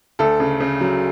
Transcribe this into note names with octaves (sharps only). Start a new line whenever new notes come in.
D2 A4
C#3
C#3
F#3